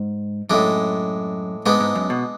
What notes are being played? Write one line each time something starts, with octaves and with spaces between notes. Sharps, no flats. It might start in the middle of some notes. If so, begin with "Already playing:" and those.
Already playing: G#2
F#2 A2 G#3 D4
G#2 G#3 B3 D4
G#2
F#2
B2